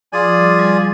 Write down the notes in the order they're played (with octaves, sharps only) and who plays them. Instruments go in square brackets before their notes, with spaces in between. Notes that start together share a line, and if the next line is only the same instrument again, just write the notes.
[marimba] F3 [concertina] F4 G#4 D5 G#5
[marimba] F3
G3
G3